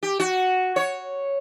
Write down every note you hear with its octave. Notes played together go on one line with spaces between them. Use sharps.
G4
F#4
C#5